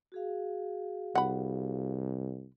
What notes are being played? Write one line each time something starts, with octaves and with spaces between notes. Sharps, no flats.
F#4 G#4 F5
C2 F#5 B5